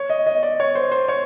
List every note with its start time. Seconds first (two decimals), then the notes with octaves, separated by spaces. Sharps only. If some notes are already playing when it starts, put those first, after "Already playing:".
Already playing: C#5
0.10 D#5
0.27 D#5
0.43 D5
0.60 C#5
0.75 C5
0.92 C5
1.08 C#5